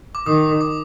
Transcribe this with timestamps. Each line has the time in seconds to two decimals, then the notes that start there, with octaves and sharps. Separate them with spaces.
0.15 D6
0.26 D#3 D#6
0.61 D6